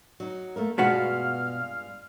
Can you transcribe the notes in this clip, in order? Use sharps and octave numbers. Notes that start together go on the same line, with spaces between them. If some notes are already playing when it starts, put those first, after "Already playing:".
F#3 D#4
A3 A#3 A#4
G2 B2 G#3 B3 F4 F#4 F5 F6